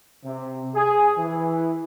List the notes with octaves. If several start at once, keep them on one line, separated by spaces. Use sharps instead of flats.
C3
G#4
E3